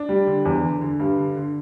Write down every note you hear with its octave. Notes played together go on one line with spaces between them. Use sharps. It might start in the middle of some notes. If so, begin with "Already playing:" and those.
Already playing: D4
G3
D3
E2
D3
D3
G2
D3
D3